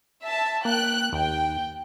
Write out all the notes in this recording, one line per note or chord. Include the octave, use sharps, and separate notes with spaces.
E5 A5
A#3 G5 F#6
D#2 G5